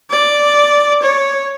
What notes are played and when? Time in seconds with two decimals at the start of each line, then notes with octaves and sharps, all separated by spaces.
0.11 D5
1.02 C#5